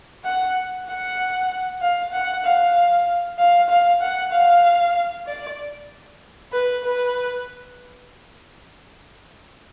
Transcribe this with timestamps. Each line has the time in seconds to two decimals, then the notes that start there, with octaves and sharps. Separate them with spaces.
0.24 F#5
0.87 F#5
1.81 F5
2.12 F#5
2.44 F5
3.38 F5
3.69 F5
4.01 F#5
4.32 F5
5.27 D5
6.52 B4
6.84 B4